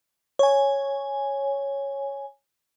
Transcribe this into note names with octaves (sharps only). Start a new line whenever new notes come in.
C#5 G#5